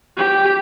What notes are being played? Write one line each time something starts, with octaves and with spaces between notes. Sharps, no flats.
G4